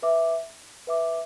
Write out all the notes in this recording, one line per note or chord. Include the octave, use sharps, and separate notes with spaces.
B4 E5 D6
B4 E5 D6